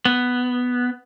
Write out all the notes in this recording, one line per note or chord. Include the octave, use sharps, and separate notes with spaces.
B3